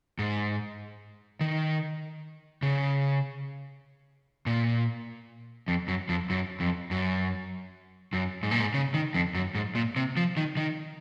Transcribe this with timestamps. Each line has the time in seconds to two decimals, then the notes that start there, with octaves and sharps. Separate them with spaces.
0.19 G#2
1.41 D#3
2.62 C#3
4.46 A#2
5.68 F2
5.88 F#2
6.09 F2
6.30 F#2
6.60 F2
6.91 F#2
8.13 F#2
8.43 G#2
8.51 A#2
8.60 G#2
8.74 C#3
8.94 D#3
9.14 F2
9.34 F#2
9.55 G#2
9.75 A#2
9.96 C3
10.17 F3
10.37 D#3
10.57 D#3